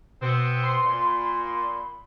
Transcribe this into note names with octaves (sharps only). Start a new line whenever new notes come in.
B2 B3 C4
C6
A#2
B5